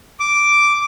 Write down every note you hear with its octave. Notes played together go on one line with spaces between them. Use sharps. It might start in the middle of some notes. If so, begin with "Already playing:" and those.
D6